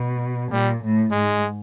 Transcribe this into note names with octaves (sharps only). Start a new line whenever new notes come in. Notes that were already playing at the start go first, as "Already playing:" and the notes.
Already playing: B2
A#2 G3
A2
G#2 G#3